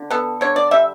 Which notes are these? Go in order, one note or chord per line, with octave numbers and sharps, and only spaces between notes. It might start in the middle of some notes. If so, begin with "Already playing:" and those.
Already playing: D3
B3 A4
D3 C#5
D5
G3 E5